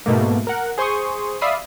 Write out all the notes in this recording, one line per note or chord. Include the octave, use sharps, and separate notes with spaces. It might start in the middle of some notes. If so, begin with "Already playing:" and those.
G#2 B2 A3 A#3
A#4 F#5
G#4 C5 C6 C#6 D#6
D5 E5 F5 B5 D#6 C7